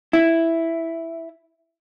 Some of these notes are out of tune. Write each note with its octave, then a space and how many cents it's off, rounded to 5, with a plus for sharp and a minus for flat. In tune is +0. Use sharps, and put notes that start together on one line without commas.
E4 +0